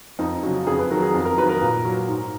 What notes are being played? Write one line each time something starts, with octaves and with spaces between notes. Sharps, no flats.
F2 D#4
C#3 F#3
F2 G#4
B4
D#3 F#3 A#4
G#4
F2
A#4
F#3 B4
D#3
A#4
A#2
F#3
G#2